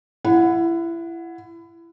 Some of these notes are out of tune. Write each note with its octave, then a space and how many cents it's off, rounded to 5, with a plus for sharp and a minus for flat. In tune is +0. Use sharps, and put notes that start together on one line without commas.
E4 +25 F#5 -15